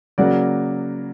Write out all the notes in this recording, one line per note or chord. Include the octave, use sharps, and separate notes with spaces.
C#3 F#3 A#3 D5 F#5